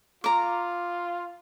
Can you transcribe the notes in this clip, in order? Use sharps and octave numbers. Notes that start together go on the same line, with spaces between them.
F4 A#5 D6